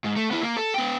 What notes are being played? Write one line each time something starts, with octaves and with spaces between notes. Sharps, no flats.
G#2
A3
B3 E4
A#3
A4
B3 G5